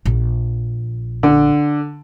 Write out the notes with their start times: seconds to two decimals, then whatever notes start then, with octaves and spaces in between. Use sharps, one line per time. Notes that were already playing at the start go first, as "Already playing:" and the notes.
0.05 A#1
1.23 D3